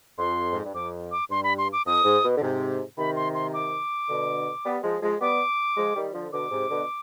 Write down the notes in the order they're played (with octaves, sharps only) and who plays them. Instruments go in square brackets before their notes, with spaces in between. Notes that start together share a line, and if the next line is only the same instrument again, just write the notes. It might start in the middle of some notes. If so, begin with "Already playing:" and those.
[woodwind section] F2 [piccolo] C6
[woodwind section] G#2
G2
[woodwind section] F2 [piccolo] D6
[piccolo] D6
[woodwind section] G2 [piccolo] C6
[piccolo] B5
C6
D6
[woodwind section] F2 [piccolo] D#6
[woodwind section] G#2
B2
D3
G#2 C3
[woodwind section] C3 D#3 [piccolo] B5
[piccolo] C6
C6
D6
[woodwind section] B2 D3
G3 B3
F3 G#3
F3 G#3
[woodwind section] G3 B3 [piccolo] D6
[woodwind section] F3 G#3
D#3 G3
D3 F3
[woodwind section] B2 D3 [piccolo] D6
[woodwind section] G#2 C3
B2 D3